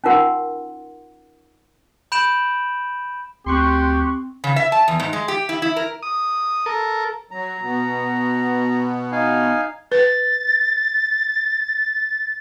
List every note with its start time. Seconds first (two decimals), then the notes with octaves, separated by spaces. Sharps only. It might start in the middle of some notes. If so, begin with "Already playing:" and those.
0.04 C#4 D#4 F4 A#4 F#5 C6
2.12 B5 G6 D7 E7 F#7
3.46 D2 C4 G4 C6 C#6 F#6
4.44 C#3
4.56 E5
4.72 A5
4.88 E2
5.00 G#2
5.13 G#3
5.28 G4
5.49 E4
5.62 E4
5.76 A#4
6.03 D#6
6.66 A4 A#4
7.31 F#3 A#5
7.62 B2 B3
9.12 D#4 F5 G#5
9.92 B4 A6